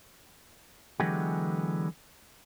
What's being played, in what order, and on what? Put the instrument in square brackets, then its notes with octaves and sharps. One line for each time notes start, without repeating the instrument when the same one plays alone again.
[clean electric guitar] D3 E3 F#3 G#3 B3 G4